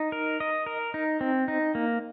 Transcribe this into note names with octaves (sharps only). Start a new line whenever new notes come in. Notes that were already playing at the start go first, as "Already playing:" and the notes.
Already playing: D#4
A#4
D#5
A#4
D#4
C4
D#4
A#3